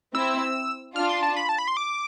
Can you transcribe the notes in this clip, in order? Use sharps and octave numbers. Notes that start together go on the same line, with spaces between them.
C4 E4 E6
D4 F4 F6
C6
A5
B5
A5
B5
C6
D6